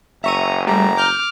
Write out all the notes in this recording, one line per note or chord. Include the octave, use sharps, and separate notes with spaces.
F#1 E5 A#5 C#6 D#7
G3 A3 A#5
D6 F6 G6